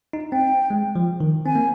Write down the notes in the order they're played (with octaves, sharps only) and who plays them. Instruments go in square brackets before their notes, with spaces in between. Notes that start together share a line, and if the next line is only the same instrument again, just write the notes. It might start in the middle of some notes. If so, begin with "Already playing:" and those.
[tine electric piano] D#4
[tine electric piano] C4 [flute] G5
[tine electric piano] G#3
F3
D#3
[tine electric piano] C4 [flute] G#5
[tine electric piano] A#3